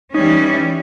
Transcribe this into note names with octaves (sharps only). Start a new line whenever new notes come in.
E3 G3 C#4 D#4